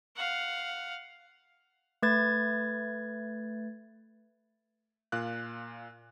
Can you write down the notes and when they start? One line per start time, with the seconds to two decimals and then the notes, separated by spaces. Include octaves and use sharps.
0.16 F5 F#5
2.02 A3 B4 G#6 A6
5.12 A#2 F5 F#6